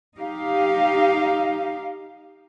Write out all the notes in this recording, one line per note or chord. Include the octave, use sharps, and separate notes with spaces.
D#4 G4 F5